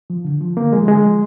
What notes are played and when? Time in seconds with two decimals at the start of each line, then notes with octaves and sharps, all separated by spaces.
0.10 F3
0.25 D3
0.41 F3
0.56 D3 A#3
0.73 F3 G#3
0.87 D3 G#3
1.03 F3